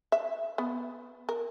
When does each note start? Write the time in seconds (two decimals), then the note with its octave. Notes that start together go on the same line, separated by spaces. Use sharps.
0.12 E5
0.58 B3
1.29 A#4